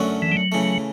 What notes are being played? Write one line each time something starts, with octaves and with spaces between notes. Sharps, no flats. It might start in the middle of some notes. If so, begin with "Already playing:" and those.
Already playing: F#2 D3 A3 C#4 F#4
E3
G3
F#3
C#3 E3 A3